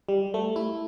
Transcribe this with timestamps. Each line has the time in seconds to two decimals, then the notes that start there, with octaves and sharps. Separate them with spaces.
0.09 G3
0.34 A3
0.56 E4